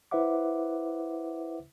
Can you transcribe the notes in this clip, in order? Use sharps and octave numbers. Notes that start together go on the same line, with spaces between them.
E4 B4 C5 E5 F#5 D6